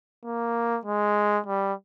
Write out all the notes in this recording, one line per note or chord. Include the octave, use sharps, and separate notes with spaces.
A#3
G#3
G3